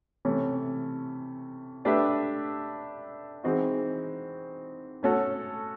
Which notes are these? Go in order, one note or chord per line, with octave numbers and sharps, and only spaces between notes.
C3 E3 A3 C#4
A3 D4 G4 B4 E5
E3 G#3 C4 D#4 F#4
A3 C#4 F#4 A4